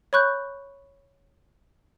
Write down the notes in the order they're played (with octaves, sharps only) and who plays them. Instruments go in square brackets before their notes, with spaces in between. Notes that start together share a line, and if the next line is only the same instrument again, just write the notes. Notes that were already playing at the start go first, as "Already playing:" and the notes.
[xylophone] C#5 B5 C#6 F#6 G6